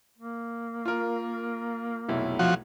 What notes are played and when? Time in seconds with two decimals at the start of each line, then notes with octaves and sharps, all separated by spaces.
0.18 A#3
0.85 F4 A#4
2.08 F1 B1 E4
2.39 F3 F#4